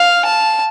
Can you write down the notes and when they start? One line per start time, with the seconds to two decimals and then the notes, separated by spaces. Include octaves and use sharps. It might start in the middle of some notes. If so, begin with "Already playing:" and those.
Already playing: F5
0.25 A5